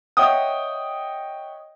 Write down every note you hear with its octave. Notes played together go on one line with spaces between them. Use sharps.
C#5 D#5 E5 F#5 G5 D#6